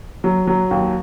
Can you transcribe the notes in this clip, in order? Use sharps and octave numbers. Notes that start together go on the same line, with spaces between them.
F#3
F#3
D#2